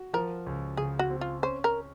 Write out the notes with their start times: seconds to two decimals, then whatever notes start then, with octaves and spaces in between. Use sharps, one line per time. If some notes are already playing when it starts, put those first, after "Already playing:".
Already playing: F#4
0.13 F3 A#4
0.46 C#2
0.77 C#3 G#4
0.99 F#4
1.10 C4
1.21 F4
1.43 C#4 C5
1.64 A#4